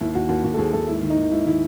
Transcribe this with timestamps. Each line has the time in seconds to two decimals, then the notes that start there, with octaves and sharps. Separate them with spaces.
0.01 D#2 E4
0.15 D#2 F#4
0.29 D#2 F#4
0.44 D#2 F#4
0.54 A4
0.58 D#2 G#4
0.73 D#2 A4
0.87 G#2 E4
1.03 D#3
1.10 D#4
1.17 D#3
1.31 G#2 E4
1.46 D#3 E4